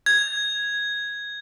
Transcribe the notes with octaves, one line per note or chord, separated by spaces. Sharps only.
G#6